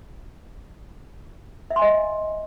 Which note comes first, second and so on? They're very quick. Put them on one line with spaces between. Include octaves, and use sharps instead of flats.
E5 F#5 C6 G#5 D#5